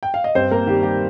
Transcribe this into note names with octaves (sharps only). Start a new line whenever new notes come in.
G5
F5
D#5
G2 C4 C5
A#3 A#4
D#3 G3 G4
G3 G4